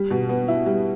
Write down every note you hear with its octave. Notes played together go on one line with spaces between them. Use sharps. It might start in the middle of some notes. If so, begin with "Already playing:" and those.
Already playing: G3
B2
B3
E4
G3